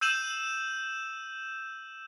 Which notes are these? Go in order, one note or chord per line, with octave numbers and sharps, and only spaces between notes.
E6 G6 D#7 E7 F#7